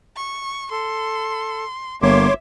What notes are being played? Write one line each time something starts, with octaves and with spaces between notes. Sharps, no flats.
C#6
A4 C6
G1 A#3 C#5 E5 C6 D6